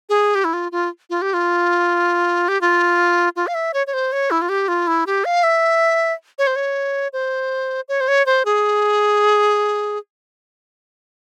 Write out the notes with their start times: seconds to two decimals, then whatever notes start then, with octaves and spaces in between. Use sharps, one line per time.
0.09 G#4
0.35 G4
0.44 E4
0.53 F4
0.72 F4
1.10 F4
1.22 G4
1.34 F4
2.48 G4
2.61 F4
3.36 F4
3.47 F5
3.55 E5
3.74 C#5
3.87 C#5
3.93 C5
4.12 C#5
4.31 E4
4.42 F4
4.49 G4
4.68 F4
4.87 E4
5.07 G4
5.25 F5
5.43 E5
6.38 C#5
6.47 C5
6.56 C#5
7.13 C5
7.89 C#5
8.01 C5
8.08 C#5
8.26 C5
8.45 G#4